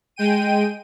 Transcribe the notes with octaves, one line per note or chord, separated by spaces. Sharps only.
G#3 G5 D#7